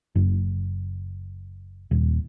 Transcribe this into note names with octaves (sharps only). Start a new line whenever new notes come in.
F#1
D#1